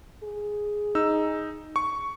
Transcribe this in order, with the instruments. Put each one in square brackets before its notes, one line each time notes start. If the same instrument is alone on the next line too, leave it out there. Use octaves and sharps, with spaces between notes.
[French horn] G#4
[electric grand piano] D#4 E6
C#6